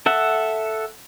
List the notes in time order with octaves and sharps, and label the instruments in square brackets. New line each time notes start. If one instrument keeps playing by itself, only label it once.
[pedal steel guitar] A4 E5 F#5